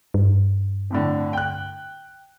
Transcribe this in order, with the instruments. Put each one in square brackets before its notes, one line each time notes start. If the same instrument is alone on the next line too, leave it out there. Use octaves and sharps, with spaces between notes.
[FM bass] G2
[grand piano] F2 A2 D3
G5 F#6